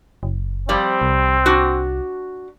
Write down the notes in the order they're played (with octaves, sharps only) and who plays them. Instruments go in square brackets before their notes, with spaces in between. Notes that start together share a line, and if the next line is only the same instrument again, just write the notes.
[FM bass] F#1
[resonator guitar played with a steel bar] F3 G3 D5 [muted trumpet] C4
[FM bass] C2
[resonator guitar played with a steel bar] D4 F#4